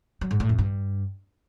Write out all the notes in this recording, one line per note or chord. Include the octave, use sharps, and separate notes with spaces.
F#3
G#2
A2
F2
G2